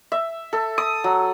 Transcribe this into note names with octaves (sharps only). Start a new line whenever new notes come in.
E5
A4
D#6
F#3